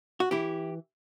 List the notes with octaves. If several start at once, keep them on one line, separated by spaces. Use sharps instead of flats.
F#4
E3 E4 G4